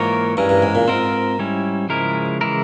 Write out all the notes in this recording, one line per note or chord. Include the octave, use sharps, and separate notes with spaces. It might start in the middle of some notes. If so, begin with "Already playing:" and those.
Already playing: G#2 E3 A#3 F4 A#4 C#5
G2 E3 G#3 C#4 E4 A#4
G2
G#2
A#2
G#2 C4 F4 A#4
G3 C#4 E4
C#3 F3 G#3 E4 A#4
C#3 E3 G#3 E4 A#4